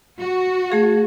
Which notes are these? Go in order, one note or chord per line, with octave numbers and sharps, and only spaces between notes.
F#4
A3 G#4 F5